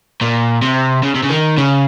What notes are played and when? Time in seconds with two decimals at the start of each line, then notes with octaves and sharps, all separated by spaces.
0.21 A#2
0.62 C3
1.03 C#3
1.15 C3
1.23 C#3
1.30 D#3
1.58 C#3